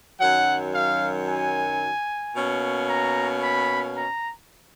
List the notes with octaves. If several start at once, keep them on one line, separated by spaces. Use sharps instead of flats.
F#2 D#3 F#3 F#5
F5
G#5
B2 A#3 C#4
A#5
B5
A#5